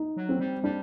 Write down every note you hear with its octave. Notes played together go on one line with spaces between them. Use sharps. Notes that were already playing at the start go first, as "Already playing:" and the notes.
Already playing: D#4
F#3
C4
G3
G3 D4